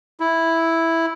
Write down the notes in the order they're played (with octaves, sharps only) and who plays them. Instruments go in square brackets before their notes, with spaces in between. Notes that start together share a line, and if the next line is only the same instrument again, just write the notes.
[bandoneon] E4